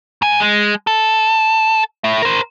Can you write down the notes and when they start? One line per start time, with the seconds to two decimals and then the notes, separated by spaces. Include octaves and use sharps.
0.22 G#2 G#5
0.40 G#3
0.87 A4
2.04 A2 E5
2.22 A#4 C5